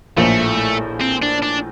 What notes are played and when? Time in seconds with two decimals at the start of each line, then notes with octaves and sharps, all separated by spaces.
0.17 A#1 A2 F3 A3 A#3
1.01 C4
1.22 D4
1.43 D4